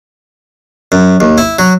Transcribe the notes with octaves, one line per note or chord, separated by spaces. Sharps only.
F#2
D#2
E4
F#3